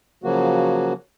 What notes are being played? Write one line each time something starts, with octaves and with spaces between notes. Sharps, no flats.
C#3 F3 F#3 A#3 F#4